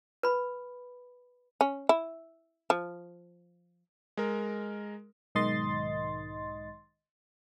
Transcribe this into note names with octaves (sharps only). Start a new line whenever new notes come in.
B4 B5
C#4
E4
F3
G#3 A#4
B1 G#2 D#3 D#5 C6 A6